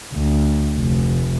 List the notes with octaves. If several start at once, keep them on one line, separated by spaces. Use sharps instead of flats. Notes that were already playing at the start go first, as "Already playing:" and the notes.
D2
F1